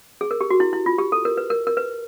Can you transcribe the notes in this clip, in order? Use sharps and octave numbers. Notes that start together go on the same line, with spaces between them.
G#4
A#4
G4
F#4
E4
E4
F4
G4
A4
A#4
B4
A#4
A#4
B4